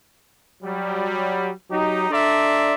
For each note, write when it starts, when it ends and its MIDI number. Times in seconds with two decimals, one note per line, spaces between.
0.63 1.50 54
0.63 1.50 55
1.70 2.06 54
1.70 2.06 63
1.70 2.06 67
2.11 2.74 62
2.11 2.74 69
2.11 2.74 74
2.11 2.74 76
2.11 2.74 82
2.11 2.74 84